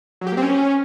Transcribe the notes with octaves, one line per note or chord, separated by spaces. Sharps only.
F#3
G4
A#3
C4
C#4